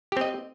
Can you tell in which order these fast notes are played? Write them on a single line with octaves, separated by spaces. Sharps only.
G4 C4 D#5